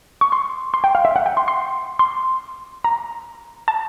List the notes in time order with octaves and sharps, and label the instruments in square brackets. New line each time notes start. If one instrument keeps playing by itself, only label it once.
[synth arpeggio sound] C#6
C6
C6
G5
F5
E5
F#5
G5
C6
C6
C6
A#5
A5